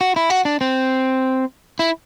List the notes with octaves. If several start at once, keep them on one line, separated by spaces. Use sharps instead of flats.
F#4
E4
F#4
D4
C4
E4